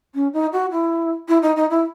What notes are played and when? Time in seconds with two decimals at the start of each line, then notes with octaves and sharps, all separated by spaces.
0.15 C#4
0.33 D#4
0.53 F#4
0.71 E4
1.28 E4
1.42 D#4
1.56 D#4
1.70 E4